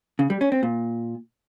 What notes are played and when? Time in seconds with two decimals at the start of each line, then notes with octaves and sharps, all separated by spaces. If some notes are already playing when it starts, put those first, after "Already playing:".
0.19 C#3
0.30 G3
0.41 C#4
0.52 C4
0.63 A#2